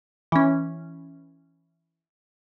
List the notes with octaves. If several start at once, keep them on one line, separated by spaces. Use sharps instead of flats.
E3 C#4